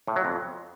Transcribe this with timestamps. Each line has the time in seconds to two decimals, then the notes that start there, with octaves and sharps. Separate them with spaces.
0.07 A2
0.16 F#3
0.25 F2